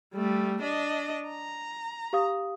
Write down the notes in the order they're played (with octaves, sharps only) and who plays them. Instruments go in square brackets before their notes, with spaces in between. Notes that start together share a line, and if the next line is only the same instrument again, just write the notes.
[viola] G3 A3
D4 D#5
A#5
[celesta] G4 F5 D#6